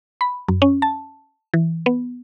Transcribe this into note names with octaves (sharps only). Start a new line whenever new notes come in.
B5
F#2
C#4
A5
E3
B3